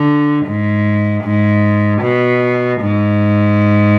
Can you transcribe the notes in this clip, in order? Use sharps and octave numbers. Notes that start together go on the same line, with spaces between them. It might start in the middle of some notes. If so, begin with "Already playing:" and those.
Already playing: D3
G#2
G#2
B2
G#2